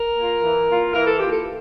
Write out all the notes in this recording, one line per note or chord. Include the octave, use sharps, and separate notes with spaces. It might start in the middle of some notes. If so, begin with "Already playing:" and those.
Already playing: A#4
A#3 F4
E3
A#3 F4
E3 A#4
A4
F4 G4
A#3
A4